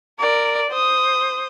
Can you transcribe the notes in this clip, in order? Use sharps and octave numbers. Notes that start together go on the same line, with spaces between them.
A#4 D5
C5 D#6